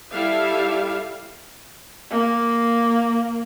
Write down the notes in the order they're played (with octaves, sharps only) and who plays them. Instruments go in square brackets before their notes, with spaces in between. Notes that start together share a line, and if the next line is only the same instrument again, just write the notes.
[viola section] G3 E4 A4 E5 F5
[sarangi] A#3